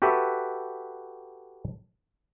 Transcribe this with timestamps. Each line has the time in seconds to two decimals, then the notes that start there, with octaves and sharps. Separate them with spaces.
0.02 F#4 G4 A4 B4 E5